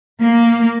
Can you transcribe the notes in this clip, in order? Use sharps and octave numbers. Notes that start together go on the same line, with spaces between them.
A#3